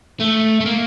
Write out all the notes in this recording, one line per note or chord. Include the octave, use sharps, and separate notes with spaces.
A3
A3
A#3